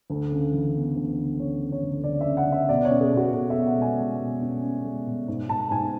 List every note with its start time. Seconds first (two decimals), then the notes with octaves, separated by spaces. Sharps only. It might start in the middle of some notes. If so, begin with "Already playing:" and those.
0.10 D2 A4
0.32 C#3
0.53 E3
0.75 B3
0.96 D2
1.18 B3
1.39 C#3 C#5
1.61 C#3
1.72 C#5
1.83 D2
2.04 C#3 D5
2.21 C#3 E5
2.37 F#5
2.47 C#3
2.52 E5
2.69 B2 D5
2.85 C#5
2.91 C#4
3.01 G#4
3.12 B2 F#4
3.33 B2 A4
3.50 B2 E5
3.66 F#5
3.77 G#3 G#5
3.98 G#3
4.20 B2
4.42 C#4
4.63 C#4
4.84 G#3
5.07 B2
5.28 G#2
5.49 G#2 A5
5.71 G#2 G#5